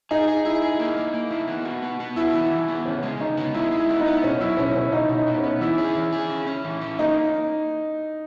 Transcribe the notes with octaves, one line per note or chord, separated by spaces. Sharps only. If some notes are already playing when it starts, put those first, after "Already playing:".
D#4 G#4
G#4
E4 G#4
G#4
A#3
A#3
A#3
E4
B3
F#4
B3
B3
E4 F#4
E3
E3
B3
C#3 C#4
G#3
C#3 D#4
B3
G#3 E4
G#3
E4
B3
D#4
B3
B2 C#4
F#3 E4
B2 C#4
B2 C#4
B2 D#4
B2
D#4
B3
C#4
B3
E3 E4
G#4
E3
G#4
C#4
C#4
E3
C#4
A#3 D#4